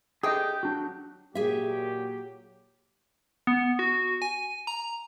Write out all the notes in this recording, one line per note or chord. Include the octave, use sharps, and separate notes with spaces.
D3 G4 G#4 D#5 G5 D#6 G6
F#3 D4 F#4
A#2 F#3 G4 G#4 E5
B3
F#4
G#5
A#5